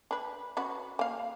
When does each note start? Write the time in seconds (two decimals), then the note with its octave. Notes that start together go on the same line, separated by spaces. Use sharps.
0.11 D4 B4
0.57 C#4 F#4 B4
0.99 A#3 F5